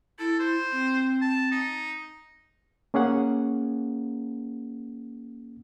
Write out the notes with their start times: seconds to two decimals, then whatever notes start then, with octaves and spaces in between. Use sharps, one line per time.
0.19 E4 A4
0.39 C5
0.72 C4
1.22 A5
1.51 D#4
2.94 A#3 C#4 G#4 F#5